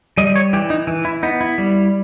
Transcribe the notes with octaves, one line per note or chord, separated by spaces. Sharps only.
G3 D#5
C#5
E3 G4
D#4
E3
E4
B3 D#4
E4
G3